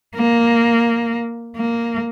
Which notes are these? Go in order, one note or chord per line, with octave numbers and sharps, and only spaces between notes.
A#3
A#3